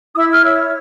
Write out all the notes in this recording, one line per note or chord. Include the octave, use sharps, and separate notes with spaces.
D#6
E4 E5 E6
F6
C#5 E5 E6